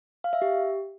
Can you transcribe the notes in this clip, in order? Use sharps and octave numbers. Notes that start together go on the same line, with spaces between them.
F5
E5
G4